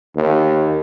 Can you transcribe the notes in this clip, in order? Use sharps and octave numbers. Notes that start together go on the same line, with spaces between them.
D#2